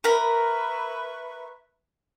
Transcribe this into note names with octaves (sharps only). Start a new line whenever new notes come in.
A#4 B4 E5 B5 C#6